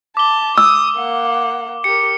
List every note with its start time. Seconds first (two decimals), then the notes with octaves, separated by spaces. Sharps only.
0.17 A5 D6 G7
0.58 D#6 E6
0.97 A#3 F#5
1.84 G4 A#4 C#7